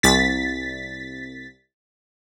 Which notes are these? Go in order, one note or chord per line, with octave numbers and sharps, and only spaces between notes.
C2 A6 B6